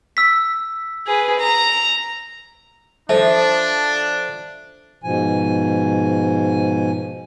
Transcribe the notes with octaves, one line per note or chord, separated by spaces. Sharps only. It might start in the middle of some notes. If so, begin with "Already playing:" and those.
E6 B6
G#4 B4
A#5
F3 D4 A4 E5 A5
G#2 B2 F3 G#5